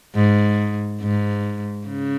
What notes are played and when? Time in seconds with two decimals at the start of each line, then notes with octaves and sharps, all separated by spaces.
0.15 G#2
1.01 G#2
1.88 C#3